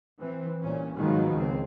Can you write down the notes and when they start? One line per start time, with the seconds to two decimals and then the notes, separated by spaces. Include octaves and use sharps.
0.19 E3 C4
0.63 C2 A#2 C#4
0.96 G#2 B2 D#3 F3 F#3
1.33 C#2 C4